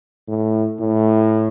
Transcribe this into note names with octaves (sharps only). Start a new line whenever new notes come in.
A2
A2